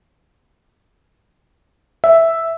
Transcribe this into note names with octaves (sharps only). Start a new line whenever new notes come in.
E5